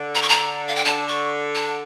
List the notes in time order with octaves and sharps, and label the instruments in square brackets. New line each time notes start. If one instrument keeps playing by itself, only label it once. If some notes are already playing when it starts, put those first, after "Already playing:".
Already playing: [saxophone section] D3
[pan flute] A#5
C#6
A#5
F5
G5
[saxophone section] D3 [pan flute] A5
[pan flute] C#6
A5